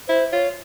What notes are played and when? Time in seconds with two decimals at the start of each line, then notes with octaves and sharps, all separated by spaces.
0.08 E4 C5
0.31 F4 C#5